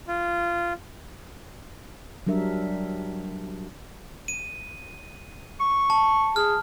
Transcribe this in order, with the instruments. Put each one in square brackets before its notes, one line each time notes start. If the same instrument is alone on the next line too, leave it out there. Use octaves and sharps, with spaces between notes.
[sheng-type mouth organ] F4
[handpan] F#3 G3 D4 A#4 E5
[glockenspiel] D#7
[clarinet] C#6
[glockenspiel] A5
[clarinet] G#4 [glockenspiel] F6